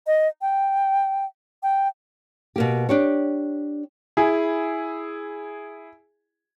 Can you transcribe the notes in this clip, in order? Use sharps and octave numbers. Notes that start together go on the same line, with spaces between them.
D#5
G5
G5
B2 A#3 G4
D4 G4 C#5
E4 G#4